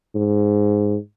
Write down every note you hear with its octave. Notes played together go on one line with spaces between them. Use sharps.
G#2